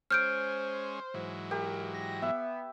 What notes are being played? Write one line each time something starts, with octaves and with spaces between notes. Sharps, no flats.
G#3 C#4 C5 F6 G6 D7
G#2 E3 F#3
G4 A#4
A#6
B3 E5